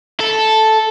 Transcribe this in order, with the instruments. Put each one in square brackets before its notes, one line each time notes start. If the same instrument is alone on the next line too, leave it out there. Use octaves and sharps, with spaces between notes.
[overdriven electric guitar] A4